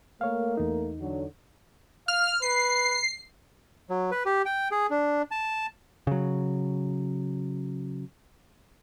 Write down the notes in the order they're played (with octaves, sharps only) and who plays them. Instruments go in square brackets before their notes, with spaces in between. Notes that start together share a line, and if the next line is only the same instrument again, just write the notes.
[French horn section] A3 A#3 A#4 [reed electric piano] C#5 F5
[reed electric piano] E2 D#4
[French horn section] D3 F#3
[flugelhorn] F5 [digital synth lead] F6
[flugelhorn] B4 [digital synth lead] C7
[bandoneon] F#3
B4
G4
G5
G#4
D4
A5
[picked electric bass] C#3 F#3